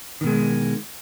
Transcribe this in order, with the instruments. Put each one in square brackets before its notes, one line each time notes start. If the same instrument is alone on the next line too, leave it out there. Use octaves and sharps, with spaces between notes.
[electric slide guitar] D#3
B2
G#3